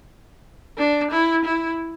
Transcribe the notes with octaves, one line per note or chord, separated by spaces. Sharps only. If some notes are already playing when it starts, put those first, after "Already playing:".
D4
E4
E4